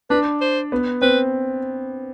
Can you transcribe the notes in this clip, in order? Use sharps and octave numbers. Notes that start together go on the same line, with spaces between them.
D4 B4
C5
B3
C4 B4